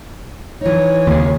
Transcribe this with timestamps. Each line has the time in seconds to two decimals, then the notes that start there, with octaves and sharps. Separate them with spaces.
0.61 E3 D#4 C#5
1.07 D#2 C#3